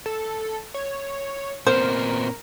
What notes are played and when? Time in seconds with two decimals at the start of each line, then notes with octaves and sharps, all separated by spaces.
0.06 A4
0.74 C#5
1.67 A#2 B3 C4 A#4 C5